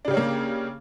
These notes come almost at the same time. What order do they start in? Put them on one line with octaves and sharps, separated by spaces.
D4 C#3 G4 C#4 A#3